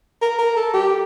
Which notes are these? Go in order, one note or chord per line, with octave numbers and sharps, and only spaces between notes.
A#4
A#4
A4
G4